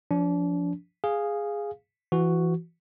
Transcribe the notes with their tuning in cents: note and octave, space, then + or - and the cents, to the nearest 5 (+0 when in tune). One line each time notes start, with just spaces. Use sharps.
F3 +0 D4 -35
G#4 -5 F5 +0
E3 +25 F#4 +0